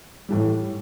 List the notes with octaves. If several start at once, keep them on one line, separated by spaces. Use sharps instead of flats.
A2 E3 G3